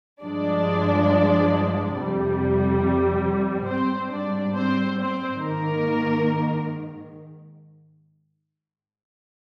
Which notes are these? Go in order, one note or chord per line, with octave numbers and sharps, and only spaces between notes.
G2 F3 G#3 D4 D5
F2 C3 G3
G#2 G3 C4 C5
D4 D5
C4 C5
C4 C5
G#2 D#3 A#3 A#4